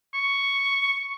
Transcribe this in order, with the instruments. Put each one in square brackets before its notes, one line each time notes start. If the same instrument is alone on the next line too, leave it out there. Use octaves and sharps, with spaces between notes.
[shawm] C#6